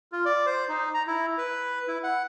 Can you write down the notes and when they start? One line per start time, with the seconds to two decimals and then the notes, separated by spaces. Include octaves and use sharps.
0.12 F4
0.25 D5
0.46 C5
0.69 D#4
0.94 A#5
1.07 E4
1.38 B4
1.88 E4
2.04 F#5